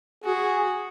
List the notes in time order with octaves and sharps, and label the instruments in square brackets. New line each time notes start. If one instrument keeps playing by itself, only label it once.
[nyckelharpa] F#4 [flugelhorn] G#4